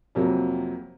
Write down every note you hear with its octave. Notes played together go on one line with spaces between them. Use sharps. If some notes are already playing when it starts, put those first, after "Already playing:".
F2 C3 F#3 A#3